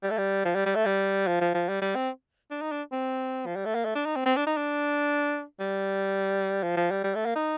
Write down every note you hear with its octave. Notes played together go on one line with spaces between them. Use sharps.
G3
A3
G3
F3
G3
G3
A3
G3
F3
F3
F3
G3
G3
C4
D4
D#4
D4
C4
F3
G3
A3
A#3
A3
D4
D#4
C4
C4
D4
D#4
D4
G3
F3
F3
G3
G3
A3
A#3
D#4